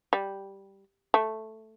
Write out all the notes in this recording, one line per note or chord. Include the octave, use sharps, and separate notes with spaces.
G3
A3